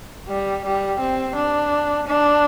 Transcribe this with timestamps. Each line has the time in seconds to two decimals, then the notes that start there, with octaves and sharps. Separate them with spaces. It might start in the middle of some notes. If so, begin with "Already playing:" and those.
0.29 G3
0.65 G3
1.00 C4
1.36 D4
2.07 D4